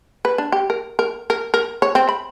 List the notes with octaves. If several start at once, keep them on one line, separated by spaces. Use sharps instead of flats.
B4
D4
G4
A#4
A#4
A#4
A#4
C#5
C4
B5